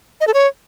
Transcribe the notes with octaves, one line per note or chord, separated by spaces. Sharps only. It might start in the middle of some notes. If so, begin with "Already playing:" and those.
D#5
A4
C#5